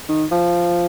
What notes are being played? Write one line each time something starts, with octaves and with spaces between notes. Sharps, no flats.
D#3
F3